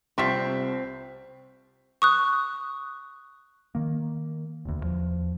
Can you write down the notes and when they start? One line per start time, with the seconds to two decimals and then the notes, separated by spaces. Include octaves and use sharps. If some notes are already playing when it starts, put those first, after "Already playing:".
0.18 C2 C3 G3 C4 F4 E5 C#6 B6
2.02 C#6 D#6 F#6
3.75 D#3 A#3
4.65 E1 D2
4.81 E2 F3